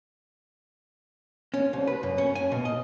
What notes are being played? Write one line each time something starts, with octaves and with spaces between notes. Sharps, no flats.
C#4
C2
B4
F#2
C#4
G#5
B2
D#5